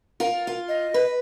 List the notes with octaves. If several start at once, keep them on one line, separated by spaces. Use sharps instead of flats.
F4 A#4
F4
D#5
B4